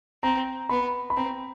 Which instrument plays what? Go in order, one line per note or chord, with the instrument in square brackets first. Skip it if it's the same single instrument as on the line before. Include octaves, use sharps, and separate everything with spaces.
[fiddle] C4 [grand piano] A#5
[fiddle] B3 [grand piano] B5
[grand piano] B5
[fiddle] C4 [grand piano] A#5